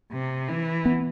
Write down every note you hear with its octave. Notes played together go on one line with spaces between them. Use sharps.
C3
E3
B3